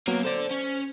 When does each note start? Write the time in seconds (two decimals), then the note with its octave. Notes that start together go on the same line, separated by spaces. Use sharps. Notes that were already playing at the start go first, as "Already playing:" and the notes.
0.08 C#3 F#3 A#3 B3
0.25 A4 C5 D5
0.51 C#4